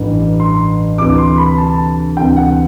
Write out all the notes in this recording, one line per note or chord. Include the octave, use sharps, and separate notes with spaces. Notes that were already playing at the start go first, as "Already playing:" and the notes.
Already playing: A1 G2 E3
C6
D2 C3 E3 D6
C6
B5
A5
D2 C3 E3 G5
F#5